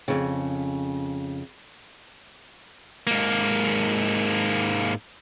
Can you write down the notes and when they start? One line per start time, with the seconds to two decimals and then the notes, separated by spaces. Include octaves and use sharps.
0.08 F2 C#3
3.07 G#2 A#3